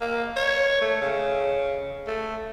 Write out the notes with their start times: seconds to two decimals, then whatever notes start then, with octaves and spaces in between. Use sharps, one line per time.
0.01 A#3
0.36 C#5
0.81 A3
1.01 C#3
2.07 A3